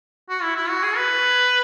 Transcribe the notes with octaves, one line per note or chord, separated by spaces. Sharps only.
F#4
E4
E4
F#4
G#4
B4